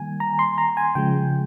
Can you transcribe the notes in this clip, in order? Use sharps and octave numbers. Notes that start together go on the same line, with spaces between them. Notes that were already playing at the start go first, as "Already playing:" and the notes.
Already playing: D#3 G3 A#3 G#5
A#5
C6
A#5
G#5
C#3 F3 G#3 G5